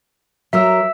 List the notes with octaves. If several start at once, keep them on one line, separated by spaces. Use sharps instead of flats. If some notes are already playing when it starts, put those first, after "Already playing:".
F#3 A#4 E5 E6